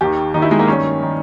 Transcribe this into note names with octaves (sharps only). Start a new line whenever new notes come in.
D#2 D#3 G4
D#2 D#3 D#4
E4
G#3
A#3
G2 D#3 C#4
D#3